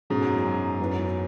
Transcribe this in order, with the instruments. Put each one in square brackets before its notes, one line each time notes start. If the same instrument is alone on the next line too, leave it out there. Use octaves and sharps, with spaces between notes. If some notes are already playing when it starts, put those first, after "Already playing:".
[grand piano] G#2 [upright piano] B2 F#3 C#4 G#4
[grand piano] F#2
F#2
[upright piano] F#2 F#3 B3 E4 B4